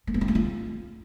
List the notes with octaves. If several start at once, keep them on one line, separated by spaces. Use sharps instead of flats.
A3
B3
C4
A3
F4